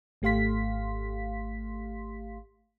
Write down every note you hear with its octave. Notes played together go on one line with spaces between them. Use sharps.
G#1 A3 G4 F5 C6 B6